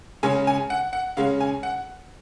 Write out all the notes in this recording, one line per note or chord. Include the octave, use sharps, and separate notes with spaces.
C#3 G#3 C#4 G#5
G#5
F#5
F#5
C#3 G#3 C#4 F5
G#5
F#5